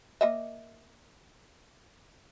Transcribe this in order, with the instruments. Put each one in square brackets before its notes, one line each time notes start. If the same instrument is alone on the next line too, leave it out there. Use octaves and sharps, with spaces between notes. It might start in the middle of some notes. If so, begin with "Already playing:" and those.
[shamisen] A#3 D#5 E5